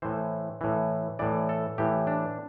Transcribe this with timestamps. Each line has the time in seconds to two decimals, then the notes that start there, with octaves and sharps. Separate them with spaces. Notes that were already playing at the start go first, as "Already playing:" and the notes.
0.02 A2 E3 C5
0.61 A2 E3
1.19 A2 E3 D5
1.49 A4
1.78 A2 E3 G4
2.07 D4